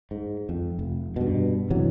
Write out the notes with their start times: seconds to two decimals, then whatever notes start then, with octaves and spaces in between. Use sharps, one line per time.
0.11 G#2
0.49 F2
0.79 F1
1.16 G2 B2
1.70 G2 C3 E3 F#3